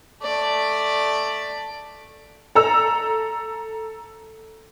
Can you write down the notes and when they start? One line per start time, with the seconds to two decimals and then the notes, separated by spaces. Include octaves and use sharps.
0.22 A3 D5
2.55 A4 A#5 E6